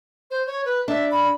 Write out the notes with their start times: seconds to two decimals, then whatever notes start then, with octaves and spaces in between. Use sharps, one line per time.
0.31 C5
0.47 C#5
0.65 B4
0.88 D4 E5
1.11 B5